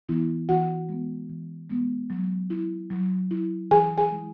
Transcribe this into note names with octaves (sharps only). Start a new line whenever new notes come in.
E3 B3 E4
E3 F#4 F#5
G#3 B3
E3
G#3 B3
F#3
E4
F#3
E4
E3 G#4 G#5
G#4 G#5
G#3 E4